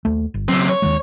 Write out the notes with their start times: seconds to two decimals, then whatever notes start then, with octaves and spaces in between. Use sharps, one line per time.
0.05 D#2 A3
0.34 G1
0.49 C#3 F#3 C4
0.69 C#5
0.82 D#2 D#3 G#3